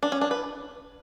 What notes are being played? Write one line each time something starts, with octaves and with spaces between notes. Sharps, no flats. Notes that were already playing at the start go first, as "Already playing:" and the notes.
D4
C#4
D4
B4